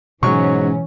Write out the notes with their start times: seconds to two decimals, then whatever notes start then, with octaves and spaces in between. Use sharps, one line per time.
0.23 G#2 B2 E3 F#3 G#3 C#4 C#6